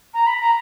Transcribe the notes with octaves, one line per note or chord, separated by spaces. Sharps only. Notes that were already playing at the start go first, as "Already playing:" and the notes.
A#5
B5
A#5